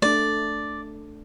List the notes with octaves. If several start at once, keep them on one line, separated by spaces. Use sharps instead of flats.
A3 D4 D5